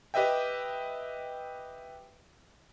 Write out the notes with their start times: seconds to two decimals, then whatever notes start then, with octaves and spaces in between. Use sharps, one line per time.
0.14 G4 B4 D#5 E5 G5